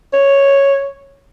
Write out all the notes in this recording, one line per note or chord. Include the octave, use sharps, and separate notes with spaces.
C#5